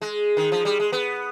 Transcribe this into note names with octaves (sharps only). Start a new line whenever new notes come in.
G#3
D#3
F3
G3
G#3
B3